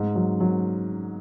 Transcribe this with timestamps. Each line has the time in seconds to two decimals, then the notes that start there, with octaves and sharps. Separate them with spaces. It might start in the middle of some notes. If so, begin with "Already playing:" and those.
Already playing: G#2
0.15 F#3
0.41 F#3